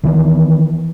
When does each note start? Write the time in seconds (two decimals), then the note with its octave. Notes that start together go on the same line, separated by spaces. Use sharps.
0.04 D#3 E3 B3